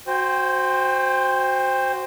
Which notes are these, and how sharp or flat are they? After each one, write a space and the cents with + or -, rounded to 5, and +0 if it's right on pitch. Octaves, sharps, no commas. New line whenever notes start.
F#4 +0 C5 +0 G5 +30